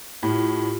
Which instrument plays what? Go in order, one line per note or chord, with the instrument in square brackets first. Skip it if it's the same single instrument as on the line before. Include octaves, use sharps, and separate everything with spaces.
[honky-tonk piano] A2 [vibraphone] G4
[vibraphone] F4